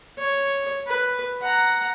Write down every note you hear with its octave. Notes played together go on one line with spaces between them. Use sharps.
C#5
B4
F#5 A#5